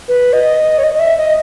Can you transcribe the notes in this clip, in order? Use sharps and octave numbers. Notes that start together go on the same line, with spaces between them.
B4
D#5
C#5
D#5
D#5
E5
D#5